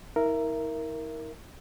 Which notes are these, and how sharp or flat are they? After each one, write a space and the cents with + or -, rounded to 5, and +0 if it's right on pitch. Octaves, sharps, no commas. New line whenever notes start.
E4 -45 A#4 +0 E5 +20